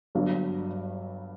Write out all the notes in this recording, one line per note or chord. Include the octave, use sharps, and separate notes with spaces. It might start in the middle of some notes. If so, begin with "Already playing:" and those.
G1 G2 F#3